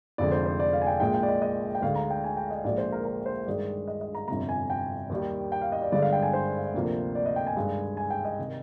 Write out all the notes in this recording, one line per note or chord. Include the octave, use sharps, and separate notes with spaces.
F1 F2 D3 G#3 D5
C5
C5
D5
F5
G#5
G5
A#1 A#2 G#3 G5
G5
D5
D#5
D#5
G5
D2 D3 G#3 F5
A#5
G5
G#5
G5
D#5
A#1 A#2 F3 G#3 D5
C5
A#4
A#4
C5
G2 D#3 G#3 D5
D#5
D#5
A#5
G1 F2 C3 A#5
G#5
G5
D#2 D#3 G3
G5
F5
D#5
D5
G1 G2 D3 G#3 D5
F5
G5
G#5
C5
D2 C3 F3 A#3
D5
D#5
G5
G#5
G2 D#3 G#3
G#5
G5
D#5
C3 D#3